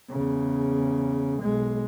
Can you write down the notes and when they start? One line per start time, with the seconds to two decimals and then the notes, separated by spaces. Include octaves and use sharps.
0.11 E2 C#3
1.42 B1 G#3